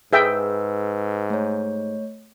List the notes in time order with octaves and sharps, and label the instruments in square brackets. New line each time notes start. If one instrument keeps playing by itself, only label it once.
[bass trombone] G#2 [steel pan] G#4 E5 G5 [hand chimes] B4 E6
[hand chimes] A3 C#5